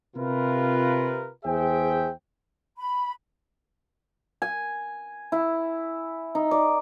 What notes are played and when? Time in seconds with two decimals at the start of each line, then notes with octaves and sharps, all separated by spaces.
0.17 C3 F4 A#4 B4
1.45 E2 G#4 C5 E5 G5
2.78 B5
4.42 G#5
5.32 E4
6.35 D#4
6.51 D5